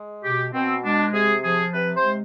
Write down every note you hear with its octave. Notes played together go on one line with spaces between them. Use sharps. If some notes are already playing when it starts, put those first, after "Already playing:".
Already playing: G#3
B2 G4
B2 C4
G#3 D4
C3 G#4
F3 G#4
C3 B4
C5
G#3